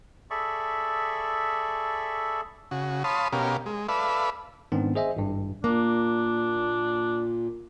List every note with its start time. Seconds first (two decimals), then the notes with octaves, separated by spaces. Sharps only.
0.31 G#4 A4 D5 E5 B5 C#6
2.71 C#3 F#4
3.04 C#5 F5 A5 B5 C6 D#6
3.33 B2 C#4 G4 A#4 F5
3.66 G#3
3.89 A4 B4 D5 E5 F5 B5
4.72 G#2 D#3 B3 C4 D4
4.95 G#4 C5 D#5 E5 G#5
5.16 G#1 G2
5.64 A#2 A#3 D4